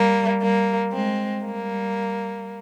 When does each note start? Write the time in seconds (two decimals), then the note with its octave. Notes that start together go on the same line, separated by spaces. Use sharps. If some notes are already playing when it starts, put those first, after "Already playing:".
Already playing: G3 A#3
0.42 G3 A#3
0.94 G#3 C4
1.45 G3 A#3